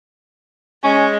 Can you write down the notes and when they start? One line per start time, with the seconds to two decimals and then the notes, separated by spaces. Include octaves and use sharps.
0.83 G#3 C#4